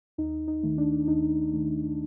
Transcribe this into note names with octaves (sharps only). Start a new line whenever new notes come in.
D#2 D#4
D#4
D#3 A3
D4
D#2 D#4
D#3 A3